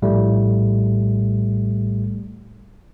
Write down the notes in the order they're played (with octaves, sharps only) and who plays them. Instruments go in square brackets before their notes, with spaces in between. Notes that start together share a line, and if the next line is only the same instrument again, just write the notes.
[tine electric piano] A#1 A2 G3 A3